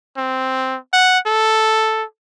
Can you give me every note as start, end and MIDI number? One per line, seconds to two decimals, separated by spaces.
0.17 0.77 60
0.93 1.19 78
1.26 2.04 69